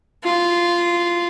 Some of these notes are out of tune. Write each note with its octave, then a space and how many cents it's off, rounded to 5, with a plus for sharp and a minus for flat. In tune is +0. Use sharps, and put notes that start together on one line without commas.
F4 -10